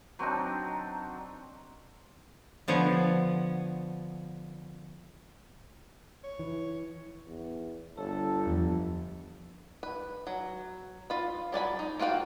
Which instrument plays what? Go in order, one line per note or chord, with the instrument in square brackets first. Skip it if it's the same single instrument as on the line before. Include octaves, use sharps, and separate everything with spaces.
[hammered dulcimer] F#3 C4 D4 D#4
[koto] D3 F3 B3 C#5
[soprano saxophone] C#5
[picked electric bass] E3
[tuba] E2
[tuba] G1 [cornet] A4 [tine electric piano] C#5
[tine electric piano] E2 F3
[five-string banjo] B4
F#3
F4 B5
F#3 D5 G#5 B5
D#4
A#3 F4 F#4 F5 G5